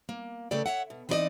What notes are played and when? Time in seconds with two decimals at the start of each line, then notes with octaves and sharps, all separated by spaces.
0.09 A#3
0.51 C#3 A3 A4 B4 D5 G5
0.66 C#5 E5 F#5
0.90 B2
1.09 E3 C4 D#4 G#4 D5 D#5